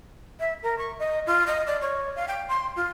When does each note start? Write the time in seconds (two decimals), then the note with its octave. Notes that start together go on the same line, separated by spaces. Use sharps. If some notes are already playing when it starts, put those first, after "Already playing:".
0.40 E5
0.62 A#4
0.78 C#6
0.99 D#5
1.26 F4
1.47 D#5
1.66 D5
1.81 C#5
2.16 F5
2.28 G5
2.49 C6
2.76 F4